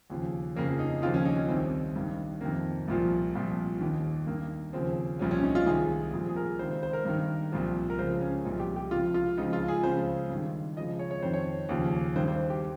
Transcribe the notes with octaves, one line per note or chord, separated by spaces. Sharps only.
D#2 C#3 F3
F2 C#3 F3 A#3
D#4
D#2 C#3 F3 F4
C#4
D#4
C#4
C2 C3 D#3 C4
G2 D#3
F2 C3 D#3 A#3
C2 A#2 F3
C2 A#2 F3
D#2 D#3
G2 D#3 A#3
D#2 C#3 F3 C4
C2 A#2 F3 C#4
C#4
D#4
F4
C2 C3 D#3 G#4
C2 A#2 F3 G#4
G#4
A#4
C#2 C3 D#3 C5
C5
C5
A#4
G2 D#3
C2 A#2 F3
A#4
C#2 C#3 F3 C5
C#4
C2 A#2 F3 D#4
G4
G4
C#2 C3 F3 F4
F4
C#2 C#3 F3 D#4
F4
G#4
C#2 C#3 F3 C5
G2
D#3
C#2 C#3 F3 D#5
C#5
C#5
F2 D#3 C5
C#5
D#2 C#3 F3
G2 D#3 C5
C5
G4